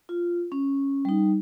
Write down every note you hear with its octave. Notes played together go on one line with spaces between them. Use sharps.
F4
C#4
G3 D#4